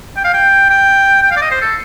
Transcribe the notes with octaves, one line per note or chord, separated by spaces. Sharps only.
G5
F5
G5
G5
G5
F5
D5
D#5
C5
A4